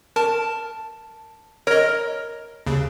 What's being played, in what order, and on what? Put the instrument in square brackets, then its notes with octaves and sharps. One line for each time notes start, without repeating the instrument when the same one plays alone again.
[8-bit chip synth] A#4 [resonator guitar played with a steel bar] A5
[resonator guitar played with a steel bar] A#4 [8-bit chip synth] C#5 D#5
[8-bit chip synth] D#2 C#3